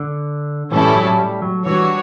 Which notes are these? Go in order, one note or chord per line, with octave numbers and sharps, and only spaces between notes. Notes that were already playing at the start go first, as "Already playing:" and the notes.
Already playing: D3
A2 E3 G3 C#4 E4 A4
F#3
G3
F#3
E3 G3 D4 F#4 C#5